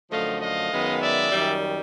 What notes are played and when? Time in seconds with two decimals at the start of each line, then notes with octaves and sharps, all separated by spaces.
0.11 F#2 D3 F3 A3 D#5 F5
0.40 D#5 F5
0.71 F#2 D#3 G#3 B3
1.01 D5 E5
1.32 F#2 D#3 G3